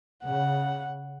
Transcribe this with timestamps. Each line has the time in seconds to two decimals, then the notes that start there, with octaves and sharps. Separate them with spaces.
0.24 C#3 F#5